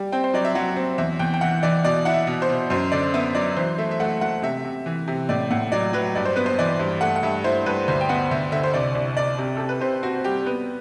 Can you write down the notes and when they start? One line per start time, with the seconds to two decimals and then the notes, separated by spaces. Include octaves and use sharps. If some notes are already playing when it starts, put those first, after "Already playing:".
Already playing: G3
0.12 C4 G5
0.24 C5
0.34 F#3 D5
0.45 E5
0.55 F#3 F#5
0.76 C4
0.98 E2 E5
1.19 E2 G5
1.34 G5
1.41 E3 F#5
1.63 E3 D5
1.84 B2 D5
2.05 E4 F#5
2.14 E5
2.27 B2
2.42 C5
2.49 B2
2.70 F#2 C5
2.92 D3 D5
3.14 B3 E5
3.35 F#3 D5
3.56 E3 C5
3.78 A3 E5
3.91 E5
4.00 A3 F#5
4.21 A3 F#5
4.43 C3 E5
4.64 C3
4.86 E3
5.08 C3
5.29 A2 D5
5.51 A2 F#5
5.72 F#3 D5
5.93 F#3 B4
6.15 G2 D5
6.25 C5
6.36 B3 B4
6.46 C5
6.59 E3 D5
6.79 G2
7.01 A3 F#5
7.16 F#5
7.23 G2 E5
7.44 E4 C5
7.66 G2 B4
7.88 D2 C5
8.01 G5
8.09 B3 F#5
8.31 D2 E5
8.52 D3 E5
8.63 C5
8.74 C2 D5
8.95 C2
9.17 C2 D5
9.38 C3
9.57 C3 A4
9.69 B4
9.81 C3 C5
10.03 C4 F#4
10.24 G3 G4
10.46 B3 B4